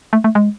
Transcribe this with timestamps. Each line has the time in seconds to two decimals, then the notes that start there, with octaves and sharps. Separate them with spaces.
0.13 A3
0.24 A3
0.35 G#3